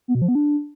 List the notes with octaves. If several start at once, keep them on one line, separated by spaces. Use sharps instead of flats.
B3
B2
F3
B3
D4